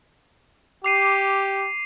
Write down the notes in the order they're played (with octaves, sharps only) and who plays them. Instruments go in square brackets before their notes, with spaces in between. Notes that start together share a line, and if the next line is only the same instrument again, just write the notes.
[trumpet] G4 [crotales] D6 C7 D#7